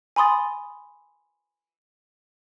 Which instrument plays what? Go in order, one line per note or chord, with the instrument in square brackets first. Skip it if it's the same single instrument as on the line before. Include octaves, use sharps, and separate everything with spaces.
[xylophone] G#5 B5 C6 D#6 A6